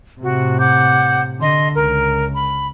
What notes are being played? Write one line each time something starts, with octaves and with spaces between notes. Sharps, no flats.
A2 C3 F#4
F#5 D6 G6
D3 D#5 C6
C#2 A#4
B5